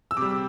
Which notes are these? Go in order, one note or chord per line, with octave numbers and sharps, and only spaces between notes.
E6
C3 G3 D6